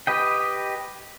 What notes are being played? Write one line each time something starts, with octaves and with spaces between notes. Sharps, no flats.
G4 B4 D#5 G5